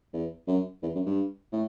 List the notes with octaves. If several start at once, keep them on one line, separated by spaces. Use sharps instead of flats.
E2
F#2
E2
F#2
G2
A2